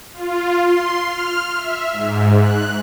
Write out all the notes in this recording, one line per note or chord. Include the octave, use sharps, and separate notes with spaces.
F4
C6
F6
E5
G#2
F#6